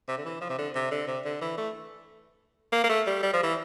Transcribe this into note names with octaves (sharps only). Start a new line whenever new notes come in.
C3
D3
E3
F3
C3
D3
C3
D3
C3
D3
E3
A3
A#3
A#3
A3
G3
G3
F3
E3